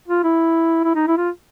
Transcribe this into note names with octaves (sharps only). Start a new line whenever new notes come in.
F4
E4
E4
D#4
E4
F4